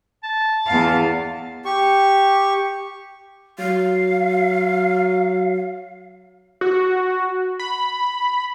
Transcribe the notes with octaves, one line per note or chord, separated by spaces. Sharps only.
A5
E2 F5
G4 C#6
F#3 F5
F#4
B5